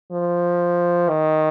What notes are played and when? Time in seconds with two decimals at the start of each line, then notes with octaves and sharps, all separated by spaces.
0.12 F3
1.09 D#3